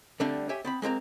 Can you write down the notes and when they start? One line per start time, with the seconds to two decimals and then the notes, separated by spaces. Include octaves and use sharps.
0.20 D3 G3 A3 C4 D4
0.49 G4 C#5 E5 G#5
0.65 B3 C4 B5
0.82 G#3 A#3 C4 A#5